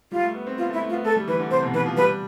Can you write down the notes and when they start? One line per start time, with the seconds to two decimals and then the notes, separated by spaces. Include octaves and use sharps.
0.12 G3 F4
0.23 A3
0.35 B3
0.47 C4
0.58 B3 F4
0.70 A3
0.73 E4
0.81 A3
0.89 F4
0.93 B3
1.04 A3 A4
1.16 G3
1.28 E3 B4
1.40 D3
1.51 C3 C5
1.63 B2
1.74 E3 B4
1.86 F3
1.97 G3 B4